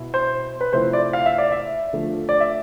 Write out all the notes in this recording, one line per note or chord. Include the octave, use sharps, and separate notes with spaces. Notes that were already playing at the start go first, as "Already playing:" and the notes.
Already playing: B2 B3 E4
C5
B4
C3 F3 A3 C4 E4 C5
D5
F5
E5
D5
E5
D3 F3 A3
D5
E5